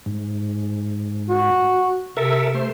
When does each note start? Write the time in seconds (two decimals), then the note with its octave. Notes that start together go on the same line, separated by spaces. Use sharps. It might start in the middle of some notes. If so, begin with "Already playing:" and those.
0.06 G#2
1.29 F#4
2.17 C3 A4 A#4 E5
2.55 A3 C5